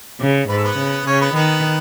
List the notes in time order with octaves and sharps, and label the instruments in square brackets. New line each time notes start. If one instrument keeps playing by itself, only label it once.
[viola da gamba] C#3
[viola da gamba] G#2 [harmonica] B4
[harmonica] A4
B3 B4
[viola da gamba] C#3
[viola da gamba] C#3 [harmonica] C#4 C#5
[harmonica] B3 B4
[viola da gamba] D#3 [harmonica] B3 B4